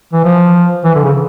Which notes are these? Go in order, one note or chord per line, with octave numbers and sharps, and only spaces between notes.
E3
F3
E3
D3
C#3